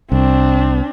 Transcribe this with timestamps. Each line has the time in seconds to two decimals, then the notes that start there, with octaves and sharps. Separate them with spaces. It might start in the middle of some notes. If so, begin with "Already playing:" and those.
0.12 C2 C4 D4